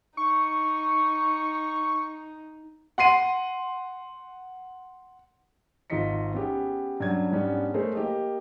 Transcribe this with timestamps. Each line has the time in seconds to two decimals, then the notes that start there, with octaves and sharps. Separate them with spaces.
0.17 D#4 C#6
2.98 F#5 C6 C7 D#7
5.90 G#1 D#4 F4 D#5 B6 C#7
6.34 B3 C#4 G4 G#4
7.00 G2 F#3 C#4 D4 G#6
7.31 G#2 G3 B3 C#4 D4
7.74 G#3 A3 G#4 A#4 C5 C#5
7.95 A#3 G4 D#5